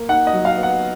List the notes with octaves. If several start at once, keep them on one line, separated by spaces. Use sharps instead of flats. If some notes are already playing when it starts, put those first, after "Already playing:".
Already playing: A#3
D#4 F#5
D#5
F#3
F5
B3
F#5